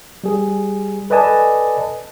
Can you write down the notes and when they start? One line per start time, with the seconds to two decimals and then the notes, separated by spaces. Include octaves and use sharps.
0.24 G3 G#4
1.10 A4 B4 D5 D#5 G#5 A5